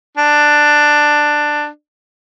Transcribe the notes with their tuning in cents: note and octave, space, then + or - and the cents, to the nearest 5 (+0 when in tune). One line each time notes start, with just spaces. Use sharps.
D4 +10